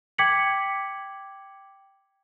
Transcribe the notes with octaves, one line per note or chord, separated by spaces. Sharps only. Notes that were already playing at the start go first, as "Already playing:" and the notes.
G5 D6 G#6 B6 C#7 F#7